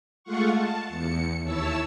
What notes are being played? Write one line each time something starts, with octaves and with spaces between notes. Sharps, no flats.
G#3 A3 F4 F5 F#5 C#6
A5
E2 C#7
D#2 E4 C#5 A5 E6